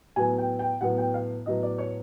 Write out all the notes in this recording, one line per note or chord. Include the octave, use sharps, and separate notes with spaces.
A2 F#3 B3 G#5
G5
G5
A2 F#3 B3 F#5
G5
F5
A2 F#3 B3 D#5
D5
C#5